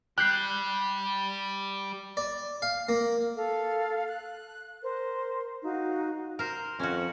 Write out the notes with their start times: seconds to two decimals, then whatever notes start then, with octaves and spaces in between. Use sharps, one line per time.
0.18 G3 G4 F#6 G6 C7
2.17 D5
2.62 F5
2.89 A#3
3.37 A4 F5
4.08 F#6
4.83 A#4 C5
5.63 D#4 F#4 F5
6.39 A#4 C5
6.79 F2 C#4 F#4